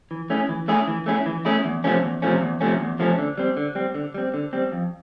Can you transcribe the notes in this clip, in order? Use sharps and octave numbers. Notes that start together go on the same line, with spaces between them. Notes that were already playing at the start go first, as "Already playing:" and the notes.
E3
A3 C#4 E4 G#4
E3
A3 C#4 E4 G#4
E3
A3 C#4 E4 G#4
E3
A3 C#4 E4 G#4
E2
C3 F3 A3 C#4
E2
C3 F3 A3 C#4
E2
C3 F3 A3 C#4
E2
C3 F3 A3 C#4
D3
G3 C4
D3
G3 C4
D3
G3 C4
D3
G3 C4
F2